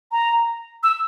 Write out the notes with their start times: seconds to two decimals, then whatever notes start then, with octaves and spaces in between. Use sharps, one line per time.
0.12 A#5
0.83 E6